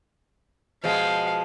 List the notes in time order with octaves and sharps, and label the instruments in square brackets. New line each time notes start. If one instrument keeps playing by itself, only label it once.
[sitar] B2 F3 G#3 [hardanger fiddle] F5